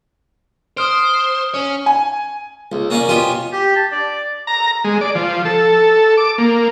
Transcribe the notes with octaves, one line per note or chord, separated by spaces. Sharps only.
C5 D#6 F6 D7
C#4 C#5
G#5
C#2
A#3 C#4 D5 F5 G#5
B2 F4 G4 C#5 G#5 C6
G4
A5
D5
A#5
G#3
D5
F3
A4
D6
A#3